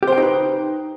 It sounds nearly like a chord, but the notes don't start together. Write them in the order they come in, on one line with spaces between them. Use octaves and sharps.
G4 C5 G5 D#4 B4